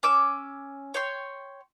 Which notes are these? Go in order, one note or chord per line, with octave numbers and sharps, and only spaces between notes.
C#4 D6 E6
C#5 G5 C6